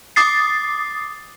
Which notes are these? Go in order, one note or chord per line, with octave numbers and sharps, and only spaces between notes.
D6 D#6 A6 C7